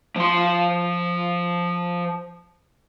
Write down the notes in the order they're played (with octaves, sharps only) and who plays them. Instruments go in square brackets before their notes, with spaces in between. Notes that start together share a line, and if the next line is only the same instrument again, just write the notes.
[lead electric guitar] F3 C6